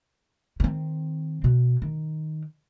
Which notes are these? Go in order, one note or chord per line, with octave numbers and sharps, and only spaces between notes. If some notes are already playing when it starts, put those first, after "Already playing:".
D#3 C4
B2
D#3